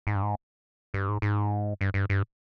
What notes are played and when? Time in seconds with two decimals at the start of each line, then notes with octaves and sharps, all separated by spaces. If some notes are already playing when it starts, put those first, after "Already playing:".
0.07 G#2
0.15 G2
0.22 G#2
0.94 G2
1.09 G#2
1.22 G#2
1.81 G2
1.94 G2
2.10 G2